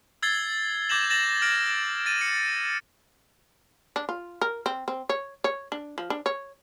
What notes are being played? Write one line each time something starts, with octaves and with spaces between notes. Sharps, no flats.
E6 G#6 A6 C7 G7
D6 G6 G#6 A#6 E7 F#7
A6 A#6 E7 F#7
F6 A#6 D7 F#7
A6 D#7
C#7
D4
F4
A#4
C4
C4
C#5
C#5
D4
F3
D4
C#5